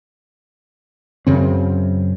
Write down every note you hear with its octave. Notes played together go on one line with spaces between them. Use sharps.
F#2 C#3 C4